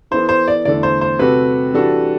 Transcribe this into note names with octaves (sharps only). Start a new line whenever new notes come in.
E3 B3 E4 A4 C5
C5
D5
E2 D3 A3 E4 A4 D5
C5
C5
C3 G3 C4 F#4 A4 B4
E3 G3 D4 F#4 A4